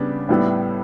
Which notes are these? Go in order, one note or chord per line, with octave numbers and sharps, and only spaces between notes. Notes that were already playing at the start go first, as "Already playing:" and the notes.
Already playing: C#3 G3 B3 D4
A2 G3 B3 E4